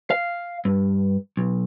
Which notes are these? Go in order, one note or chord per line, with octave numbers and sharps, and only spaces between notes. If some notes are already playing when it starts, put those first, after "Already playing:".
F5
G2
B1